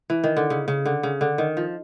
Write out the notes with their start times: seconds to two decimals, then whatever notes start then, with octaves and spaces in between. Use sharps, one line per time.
0.10 E3
0.24 D#3
0.37 D3
0.50 C#3
0.68 C#3
0.86 D3
1.03 C#3
1.21 D3
1.38 D#3
1.57 F3